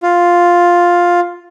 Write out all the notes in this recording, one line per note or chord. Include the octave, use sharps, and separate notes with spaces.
F4